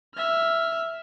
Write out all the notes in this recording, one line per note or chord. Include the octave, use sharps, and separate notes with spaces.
E5 F6